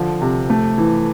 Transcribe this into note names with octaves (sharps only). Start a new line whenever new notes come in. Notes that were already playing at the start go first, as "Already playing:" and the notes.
Already playing: D3 F3
C3
A3
E3